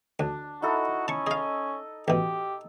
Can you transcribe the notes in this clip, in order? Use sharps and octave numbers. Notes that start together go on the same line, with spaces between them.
D2 D4
D#4 E4 F#4 A4
C#4 A5 C#6
G#4 D#5 F5
A1 B2 G4